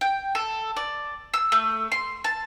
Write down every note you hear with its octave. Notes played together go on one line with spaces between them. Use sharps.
G5
A4
D5
E6
A3
C6
A5